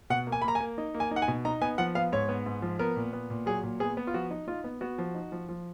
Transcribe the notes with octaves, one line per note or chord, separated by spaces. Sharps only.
B2 F#5
A#3
G#5
B5
A#3 A#5
G#5
A#3
D#4
A#3
G#5
D#4
F#5
G#5
B2
D#4 A#5
B3 G#5
F3 F#5
B3 F5
G#2 C#5
B3
G#2
F3
B3 A#4
A#2
B3
A#2
F#3 G#4
A#2
B3 G#4
B3
F4
F3 F#4
D#4
D#4 F4
B3
B3 F#4
F3
D#4
F3
F3